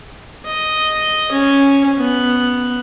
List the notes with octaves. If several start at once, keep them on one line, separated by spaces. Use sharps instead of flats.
D#5
C#4
B3